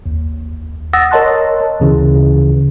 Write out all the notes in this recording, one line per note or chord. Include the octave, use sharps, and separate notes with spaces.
G#1 D#2
F#5 D#6 E6 A6 A#6
A#4 C#5 D#5 A5 C6 F#6
D2 C#3 E3